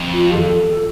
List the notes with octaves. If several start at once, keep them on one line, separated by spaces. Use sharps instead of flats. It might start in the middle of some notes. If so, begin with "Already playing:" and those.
Already playing: F2
F4
A4